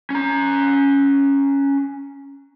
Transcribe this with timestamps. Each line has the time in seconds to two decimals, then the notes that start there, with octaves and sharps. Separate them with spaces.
0.10 C#4 A#5